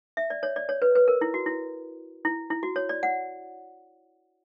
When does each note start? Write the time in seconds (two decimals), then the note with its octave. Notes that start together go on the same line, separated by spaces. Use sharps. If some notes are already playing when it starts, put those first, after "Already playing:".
0.17 E5
0.30 D5
0.43 C#5
0.56 D5
0.69 C#5
0.82 B4
0.96 B4
1.08 A#4
1.21 E4
1.34 F#4
1.46 E4
2.25 E4
2.50 E4
2.63 F#4
2.76 C#5
2.89 D5
3.03 F#5